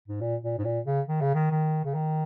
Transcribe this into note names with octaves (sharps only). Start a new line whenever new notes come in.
G#2
A#2
A#2
G#2
A#2
C#3
D#3
C#3
D#3
D#3
C#3
D#3